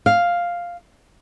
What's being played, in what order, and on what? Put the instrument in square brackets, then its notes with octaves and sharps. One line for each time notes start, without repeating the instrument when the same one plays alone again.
[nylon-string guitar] F5